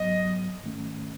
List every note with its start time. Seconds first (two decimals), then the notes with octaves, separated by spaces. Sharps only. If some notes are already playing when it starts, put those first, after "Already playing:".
Already playing: G#2 F#3 B3 D#5
0.63 G#2 D#3 A3 C#4